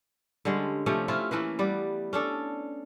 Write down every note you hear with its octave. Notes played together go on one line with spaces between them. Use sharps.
D3 G3 G#3 C#4
C3 F3 A3 C#4
C4 C#4 E4 F4
E3 A3 A#3 B4
G3 B3 D5
C#4 D4 A4 D5